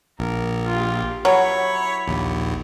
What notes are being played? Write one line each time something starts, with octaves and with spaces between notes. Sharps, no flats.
A#1 A#4
F4 G4
F#3 E4 C#5 B5
A#1 D#2